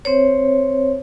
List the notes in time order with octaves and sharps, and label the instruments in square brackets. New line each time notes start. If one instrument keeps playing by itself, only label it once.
[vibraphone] C4 C5 C#5